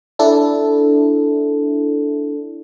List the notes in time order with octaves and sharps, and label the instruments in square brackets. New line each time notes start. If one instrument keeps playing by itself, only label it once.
[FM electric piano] D4 E4 A4